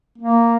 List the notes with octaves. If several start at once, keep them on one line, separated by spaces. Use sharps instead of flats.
A#3